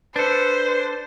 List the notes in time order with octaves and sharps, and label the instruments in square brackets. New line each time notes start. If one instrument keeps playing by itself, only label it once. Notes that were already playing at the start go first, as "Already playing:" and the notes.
[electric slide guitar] D4 A4 [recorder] B4 [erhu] C5